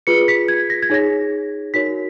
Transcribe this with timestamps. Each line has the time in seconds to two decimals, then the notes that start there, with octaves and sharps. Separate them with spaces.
0.07 F4 G#4 B4 C#7
0.28 B6
0.48 G#6
0.70 A#6
0.82 G#6
0.90 D#4 G#4 C#5 A#6
1.74 D#4 F#4 A#4 C#5 B6